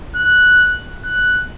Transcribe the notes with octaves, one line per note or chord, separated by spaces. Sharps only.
F#6
F#6